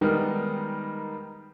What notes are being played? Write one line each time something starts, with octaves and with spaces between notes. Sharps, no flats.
D#3 G3 G#3 B3 D#4 A#4